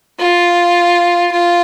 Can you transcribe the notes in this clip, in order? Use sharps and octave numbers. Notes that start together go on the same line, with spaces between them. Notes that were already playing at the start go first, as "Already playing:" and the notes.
F4
F4